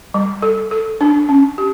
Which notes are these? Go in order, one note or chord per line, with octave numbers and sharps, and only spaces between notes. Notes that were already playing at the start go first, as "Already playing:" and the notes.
G3
A4
A4
D4
C#4
G4